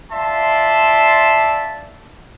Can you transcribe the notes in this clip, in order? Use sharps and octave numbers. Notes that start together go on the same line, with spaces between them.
F4 D5 E5 A5 C6